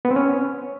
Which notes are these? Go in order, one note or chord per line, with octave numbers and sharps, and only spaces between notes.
B3
C4
C#4